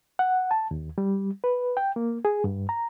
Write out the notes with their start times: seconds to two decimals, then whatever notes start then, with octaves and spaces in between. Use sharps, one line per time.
0.19 F#5
0.51 A5
0.71 D#2
0.98 G3
1.44 B4
1.77 G5
1.96 A#3
2.25 G#4
2.44 G2
2.69 A#5